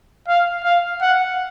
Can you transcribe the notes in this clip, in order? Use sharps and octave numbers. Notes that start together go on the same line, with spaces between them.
F5
F5
F#5